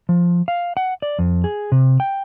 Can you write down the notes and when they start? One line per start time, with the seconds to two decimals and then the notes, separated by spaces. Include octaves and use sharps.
0.09 F3
0.48 F5
0.77 F#5
1.02 D5
1.19 F2
1.44 G#4
1.72 C3
2.00 G5